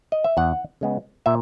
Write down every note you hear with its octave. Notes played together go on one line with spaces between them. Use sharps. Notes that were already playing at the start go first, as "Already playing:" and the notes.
D#5
E5
E2 F#5
C#3 G#3 B3
A#2 E5